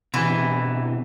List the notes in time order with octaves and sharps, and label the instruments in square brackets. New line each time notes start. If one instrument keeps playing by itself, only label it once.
[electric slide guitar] B2 D3 C4 [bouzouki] E3